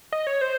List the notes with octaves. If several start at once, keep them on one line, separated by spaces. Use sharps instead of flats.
D#5
C#5
C5